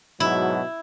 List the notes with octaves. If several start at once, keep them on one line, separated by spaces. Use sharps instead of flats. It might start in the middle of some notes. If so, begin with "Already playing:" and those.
G#2 B2 F#3 E4